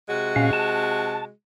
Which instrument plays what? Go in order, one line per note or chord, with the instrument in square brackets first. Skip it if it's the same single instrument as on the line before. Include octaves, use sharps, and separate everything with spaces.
[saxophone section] C3 G#3 F#4
[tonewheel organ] A#2 C#4 F5
A5